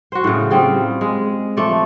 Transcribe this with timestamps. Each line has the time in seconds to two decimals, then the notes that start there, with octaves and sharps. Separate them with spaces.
0.12 F#4 C5
0.24 A2 C#3
0.50 G3 C4 F4 G#4
1.01 G#3
1.57 F3 A3 D5